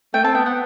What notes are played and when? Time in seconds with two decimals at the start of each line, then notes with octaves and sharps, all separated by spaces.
0.14 A3 G5
0.24 C4 A5
0.35 B3 G5
0.46 B3 F#5